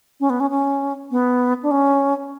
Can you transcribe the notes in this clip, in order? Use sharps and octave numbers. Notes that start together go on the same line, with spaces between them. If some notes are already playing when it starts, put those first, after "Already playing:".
C#4
B3
C#4
C#4
B3
D4
C#4